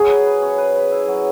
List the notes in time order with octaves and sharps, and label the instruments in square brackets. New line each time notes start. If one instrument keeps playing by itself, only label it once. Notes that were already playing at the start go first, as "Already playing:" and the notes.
Already playing: [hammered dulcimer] F#3 [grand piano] G#4
[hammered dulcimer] B4
B4
C#4
B4
B4
E4
F#3